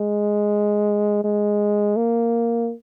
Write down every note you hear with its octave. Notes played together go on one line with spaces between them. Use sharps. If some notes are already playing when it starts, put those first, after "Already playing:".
Already playing: G#3
G#3
A#3